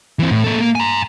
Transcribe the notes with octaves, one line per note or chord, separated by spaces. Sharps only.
E3 C4
A2
A#3 A4
A#3
G#5 A#5